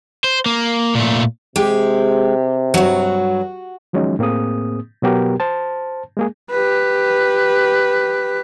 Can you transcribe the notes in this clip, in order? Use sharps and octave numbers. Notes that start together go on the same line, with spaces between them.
C5
A#3
A#2 A3
C3 G#3 G4
G2 F#3 F#4
D#3 F3 F#3 G#3 C#4 D#4
A2 A#3 C4 G#4 D#6
B2 F#3 B3 G4 A#4
C5 A5
G#3 A#3 G#4
G4 B4